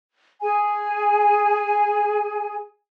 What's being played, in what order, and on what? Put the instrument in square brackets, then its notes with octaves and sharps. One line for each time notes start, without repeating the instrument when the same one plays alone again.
[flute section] G#4 G#5